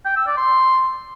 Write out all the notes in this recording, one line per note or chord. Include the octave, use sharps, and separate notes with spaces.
G5
E6
D5
C6